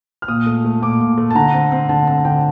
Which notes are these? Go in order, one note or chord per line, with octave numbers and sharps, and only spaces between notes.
F6
A#2 D#6
A3
A3
A#2 D6
A#2
A3
A5
D3 A#5
C4
C4
D3 A5
C4 A5
D3 G5